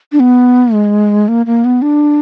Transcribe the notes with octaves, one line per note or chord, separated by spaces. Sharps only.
D4
B3
G#3
A#3
A#3
B3
D4